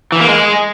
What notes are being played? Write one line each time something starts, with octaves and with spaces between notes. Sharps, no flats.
E3
A#3
G#3